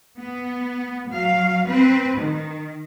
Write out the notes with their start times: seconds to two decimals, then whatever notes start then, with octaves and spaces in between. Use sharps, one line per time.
0.18 B3
1.08 F#3 F5
1.65 C4 B4
2.18 D#3